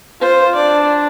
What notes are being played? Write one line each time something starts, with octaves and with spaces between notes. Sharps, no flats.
F4 C5
D4 D5